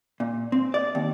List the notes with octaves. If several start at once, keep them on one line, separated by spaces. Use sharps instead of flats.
A#2
C4
D5
D#2